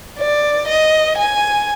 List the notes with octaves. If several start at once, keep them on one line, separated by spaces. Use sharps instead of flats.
D5
D#5
G#5